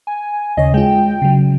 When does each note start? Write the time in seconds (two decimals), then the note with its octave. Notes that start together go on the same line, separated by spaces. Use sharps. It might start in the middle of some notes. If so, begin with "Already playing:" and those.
0.07 G#5
0.57 D#2 C#3 C#5 D#5
0.74 G#3 F4 G5
1.22 C#3 F#3